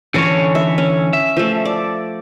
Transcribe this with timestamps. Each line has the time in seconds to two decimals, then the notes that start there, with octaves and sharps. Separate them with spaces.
0.14 D3 E3 C#4 A4 C#5
0.55 E5
0.78 C#4
1.13 E5
1.37 F3 A3
1.65 D5